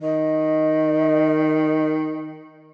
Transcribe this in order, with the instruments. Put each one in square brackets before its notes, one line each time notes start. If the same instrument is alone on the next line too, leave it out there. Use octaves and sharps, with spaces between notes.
[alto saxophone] D#3 [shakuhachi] D#5